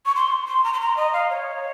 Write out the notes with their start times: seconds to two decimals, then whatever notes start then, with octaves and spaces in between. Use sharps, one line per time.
0.06 C#6
0.16 C6
0.48 C6
0.64 A#5
0.73 C6
0.81 A#5
0.97 D#5
1.13 F5
1.30 C#5